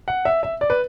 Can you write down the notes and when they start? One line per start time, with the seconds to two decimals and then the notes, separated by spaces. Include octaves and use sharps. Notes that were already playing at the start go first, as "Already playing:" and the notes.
0.08 F#5
0.25 E5
0.43 E5
0.61 D5
0.70 B4